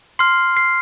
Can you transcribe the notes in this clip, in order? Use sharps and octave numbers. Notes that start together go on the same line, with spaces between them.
C6 F6 C7
C7